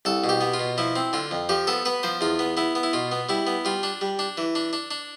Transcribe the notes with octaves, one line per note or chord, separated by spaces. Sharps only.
C2 A4
B2
G4
B3
F4
B2
F3 E4
C4
D3 F4
F2
F3 G4
B3 A4
B3 B4
F3 C5
E2 F4
B3
B3 E4
B3
E4
B2 F4
B3
G3 E4
B3
G3 F4
D4
G3
D4
E3
D4
D4
D4